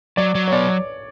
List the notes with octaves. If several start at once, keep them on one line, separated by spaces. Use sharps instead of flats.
F#3 D5
F#3
C#5
B3 D5